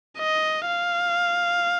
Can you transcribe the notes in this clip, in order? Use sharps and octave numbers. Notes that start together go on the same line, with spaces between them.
D#5
F5